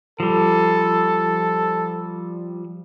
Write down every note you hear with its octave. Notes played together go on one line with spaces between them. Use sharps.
F3 G3 A4